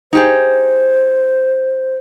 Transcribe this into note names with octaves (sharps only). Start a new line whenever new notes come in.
D#4 G4 G#4 C5